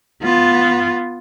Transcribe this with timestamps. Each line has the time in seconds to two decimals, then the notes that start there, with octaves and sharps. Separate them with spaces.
0.22 B3 F4